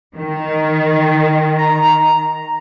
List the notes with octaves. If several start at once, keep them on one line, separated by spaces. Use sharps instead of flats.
D#3
A#5